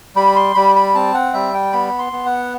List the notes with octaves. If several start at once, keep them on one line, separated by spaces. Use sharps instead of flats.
G3 B5
C6
G3 B5
B5
C4 A5
F#5
G3 E5
G5
B3 B5
C6
B3
F#5